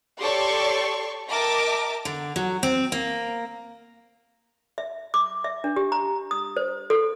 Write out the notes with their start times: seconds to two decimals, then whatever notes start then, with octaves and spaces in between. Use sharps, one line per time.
0.21 G4 A4 C#5 D5 C6 C#6
1.30 A#4 D#5 E5 G5 A5 D6
2.05 D3
2.36 F#3
2.63 C4
2.92 A#3
4.78 E5
5.14 D6
5.44 E5
5.64 D4
5.76 G4
5.92 A#5
6.31 D#6
6.57 C5
6.90 A4